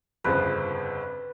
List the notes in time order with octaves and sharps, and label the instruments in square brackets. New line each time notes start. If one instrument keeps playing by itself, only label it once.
[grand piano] G1 F2 C#3 F3 [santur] B4